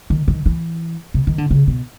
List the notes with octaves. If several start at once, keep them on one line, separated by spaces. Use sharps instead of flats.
D#3
D#3
E3
C3
D#3
D3
C#3
B2